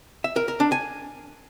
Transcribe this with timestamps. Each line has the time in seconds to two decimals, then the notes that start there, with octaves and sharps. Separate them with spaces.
0.24 E5
0.36 A#4
0.48 A#4
0.60 D4
0.72 G#5